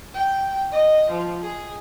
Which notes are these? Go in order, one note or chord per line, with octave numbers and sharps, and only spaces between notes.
G5
D#5
F3
G#4